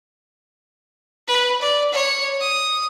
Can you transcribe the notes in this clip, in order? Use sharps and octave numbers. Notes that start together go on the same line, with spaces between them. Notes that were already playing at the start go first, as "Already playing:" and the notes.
B4
D5
C#5
D#6